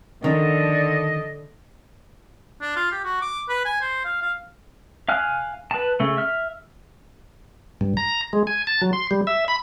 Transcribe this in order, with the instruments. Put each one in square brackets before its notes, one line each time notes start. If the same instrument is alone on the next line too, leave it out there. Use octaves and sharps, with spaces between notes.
[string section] D3 [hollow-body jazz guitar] D#3 [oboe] D#5
[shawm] D4
F4
G4
F#4
D6
B4
G#5
C5
F5
F5
[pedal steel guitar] F5 G#5 F6 F#6
B4 A5
C#3 A3
E5 F6
[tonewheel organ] G2
A#5
G#3
G#5
A5
F#3
C6
G3
E5
B5